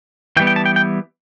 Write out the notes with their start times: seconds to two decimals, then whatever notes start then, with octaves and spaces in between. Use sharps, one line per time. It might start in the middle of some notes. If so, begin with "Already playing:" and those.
0.37 E3 G5
0.40 G3 B3
0.47 G5
0.56 A5
0.66 G5
0.76 G5